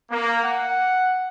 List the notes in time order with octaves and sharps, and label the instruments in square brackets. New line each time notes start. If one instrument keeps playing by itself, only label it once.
[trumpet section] A#3
F#5